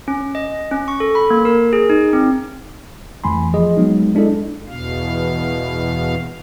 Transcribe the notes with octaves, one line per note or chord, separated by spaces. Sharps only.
C#4
D#5
C#4
C#6
A4
B5
A#3
A#4
G#4
D#4
C4
F2 E3 A3 G#5 B5 C6
F3 G#4 D#5
F#3 G#3 B3 D#4
G#3 D4 E4 A4 D#5
E2 B2 F5